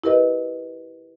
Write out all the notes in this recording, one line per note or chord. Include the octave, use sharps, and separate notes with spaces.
E4 G4 A#4 B4 D#5